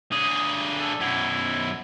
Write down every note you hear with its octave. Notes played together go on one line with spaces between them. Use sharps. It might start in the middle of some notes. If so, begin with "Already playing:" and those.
D3 G#4 D#6
A4
F#2 B2 E4